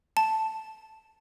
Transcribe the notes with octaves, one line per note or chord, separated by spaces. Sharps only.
A5